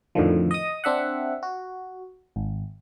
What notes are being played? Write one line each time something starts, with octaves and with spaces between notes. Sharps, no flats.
F2 A2 D3 D#3 F3
D#5 D#6
C4 D4 E5 F#5
F#4
G#1